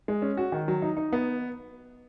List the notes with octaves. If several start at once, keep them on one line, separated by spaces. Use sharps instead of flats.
G#3
C#4
F#4
D#3
F#3
D#4
D#4
B3